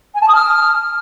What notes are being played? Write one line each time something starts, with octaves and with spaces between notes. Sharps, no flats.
G#5
A5
D#6
F6